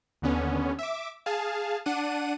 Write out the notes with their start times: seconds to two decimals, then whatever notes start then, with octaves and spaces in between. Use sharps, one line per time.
0.22 D#2 D3 B3 C#4
0.79 E5 D6
1.26 G#4 F5 A5
1.86 D4 F#5 D#7